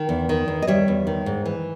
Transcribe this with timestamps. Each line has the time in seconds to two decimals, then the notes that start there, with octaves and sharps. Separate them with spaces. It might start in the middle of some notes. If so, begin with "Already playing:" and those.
Already playing: D#3
0.09 E2
0.29 D#3
0.48 E2
0.62 D#5
0.67 G3 C#5 E5
0.88 E2
1.07 D#3
1.26 G#2
1.45 E3